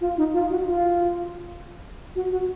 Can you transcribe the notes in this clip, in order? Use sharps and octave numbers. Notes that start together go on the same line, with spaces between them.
F4
D#4
F4
F#4
F4
F#4
F#4